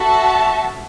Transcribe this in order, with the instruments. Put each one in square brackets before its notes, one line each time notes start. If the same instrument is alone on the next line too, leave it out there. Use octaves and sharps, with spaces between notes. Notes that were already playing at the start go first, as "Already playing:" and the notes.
Already playing: [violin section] F#4 A4 E5 A5